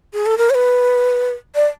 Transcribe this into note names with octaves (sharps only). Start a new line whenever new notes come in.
G#4
A4
A#4
C#5
B4
D5